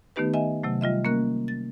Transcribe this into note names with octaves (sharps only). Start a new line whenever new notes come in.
D#3 A3 B3 D#4 G4 B4
D#5 E5 G#5
C3 F#3 A3
G3 F4 D#5 E5
A#3 C#4 A#4 F#6
A6